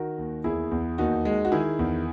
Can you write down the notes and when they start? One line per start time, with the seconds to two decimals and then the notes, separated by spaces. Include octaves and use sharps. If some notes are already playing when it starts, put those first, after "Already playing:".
Already playing: D#3 F#4 A#4
0.18 D#2
0.44 E2 E4 G#4
0.71 E2
0.98 D#2 D#4 F#4
1.25 G#3
1.45 F#4
1.52 D#3 E4 G#4
1.79 E2